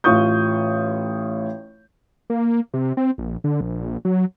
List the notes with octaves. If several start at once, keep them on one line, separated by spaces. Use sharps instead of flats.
A1 F4 F5 C#6 D#6 G6
A#3
C3
C4
A#1
D3
A#1
F#3